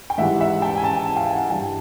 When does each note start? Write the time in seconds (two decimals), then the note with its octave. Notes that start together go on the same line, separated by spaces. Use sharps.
0.10 G5
0.18 G#2 E3 G3 E5 F#5
0.40 E5 F#5
0.62 G5 A5
0.78 G#5
0.83 G5 A5
1.16 F5 G5
1.33 F#5 G#5
1.50 G2 E3 G3 G5 A5